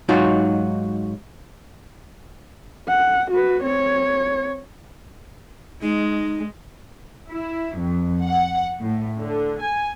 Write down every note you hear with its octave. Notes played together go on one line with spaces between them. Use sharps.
G#2 F#3 D#4 F4 F#4
F#5
F#4 B4
C4 C#5
G#3 D#4
E4
F2
F#5
A2
D3
G#5